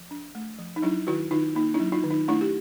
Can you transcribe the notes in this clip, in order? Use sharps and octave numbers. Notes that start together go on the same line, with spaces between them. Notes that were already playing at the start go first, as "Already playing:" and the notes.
Already playing: F3
D4
A3
F3
D#4
F#3 D4 E4
D#3 E4 F#4
D#3 D#4 F4
A#3 D#4
D4 E4
F#3
D#4 F4
D#3
D#4
A3 D4 E4
G4